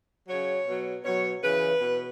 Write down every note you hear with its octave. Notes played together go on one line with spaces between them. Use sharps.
C#3 F#3 C#5
B2 F#3
B2 F#3 C#5
C#3 E3 B4
B2